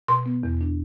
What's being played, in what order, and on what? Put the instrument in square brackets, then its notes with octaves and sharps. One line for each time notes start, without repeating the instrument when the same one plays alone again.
[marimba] B2 C6
B3
E2
D4